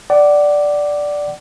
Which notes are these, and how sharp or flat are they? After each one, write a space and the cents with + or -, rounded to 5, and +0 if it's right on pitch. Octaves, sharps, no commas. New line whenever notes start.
D5 +0 F#5 +30